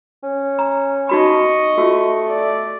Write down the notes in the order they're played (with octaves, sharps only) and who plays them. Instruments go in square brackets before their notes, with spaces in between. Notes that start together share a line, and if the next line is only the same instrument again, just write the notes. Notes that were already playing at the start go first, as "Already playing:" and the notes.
[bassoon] C#4
[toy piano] A#5
[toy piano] D#4 F#4 B5 [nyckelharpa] D#5 C#6
[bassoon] A3 [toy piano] F4 F#4
[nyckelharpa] D5